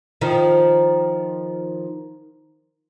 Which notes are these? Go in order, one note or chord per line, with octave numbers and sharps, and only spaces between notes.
D#3 F3